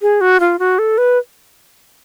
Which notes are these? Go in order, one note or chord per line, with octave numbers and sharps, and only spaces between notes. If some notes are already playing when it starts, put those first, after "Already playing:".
G#4
F#4
F4
F#4
A4
B4